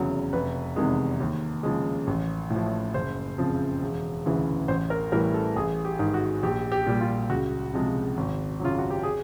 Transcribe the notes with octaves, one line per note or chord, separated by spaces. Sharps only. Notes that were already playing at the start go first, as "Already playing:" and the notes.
Already playing: F1 E2 C#3 F#3
F1 B4
E2 C3 D#3 G#3
D#2
C#3 F3 G#3
A1
A2
F3
F#1 C5
F2 C#3 F3
E1
D2 C#3 E3
A1 C5
A#4
A2 E3 G3 A#4
A4
A1 G#4
G4
G#2 D#3
F#4
A#1 G4
G4
A#2 G3
F4
C#2 F#4
C3 F3 G#3
G#1
F#2 C#3 F#3 F4
F#4
G4
G#4